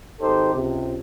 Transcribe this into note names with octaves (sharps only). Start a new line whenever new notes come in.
G#1 D#4 G4 A4 C5
C#2 C3